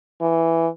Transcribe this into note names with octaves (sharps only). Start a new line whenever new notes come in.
E3